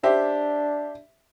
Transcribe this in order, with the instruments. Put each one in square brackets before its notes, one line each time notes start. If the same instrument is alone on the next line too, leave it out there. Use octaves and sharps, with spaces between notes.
[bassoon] D4 [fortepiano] G4 C5 E5